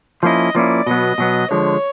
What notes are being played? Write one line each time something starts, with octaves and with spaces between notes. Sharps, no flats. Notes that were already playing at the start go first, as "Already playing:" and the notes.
F3 A#3 C#4 E4 D#5
F3 A#3 C#4 E4 D5
B2 F#3 B3 D#5
B2 F#3 B3
D3 F3 G#3 C#5